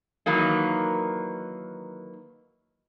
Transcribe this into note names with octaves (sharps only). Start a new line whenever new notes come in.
D#3 E3 F#3 A#3 D#4